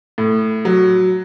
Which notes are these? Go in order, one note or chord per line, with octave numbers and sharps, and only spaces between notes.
A2
F#3